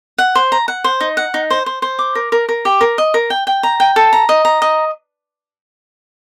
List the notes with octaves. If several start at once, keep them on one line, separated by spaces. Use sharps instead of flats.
F#5
C5
A#5
F#5
C5
D#4
F#5
D#4
C5
C5
C5
D6
A#4
A#4
A#4
G4
A#4
D#5
A#4
G5
G5
A#5
G5
A4
A#5
D#5
A#5
D#5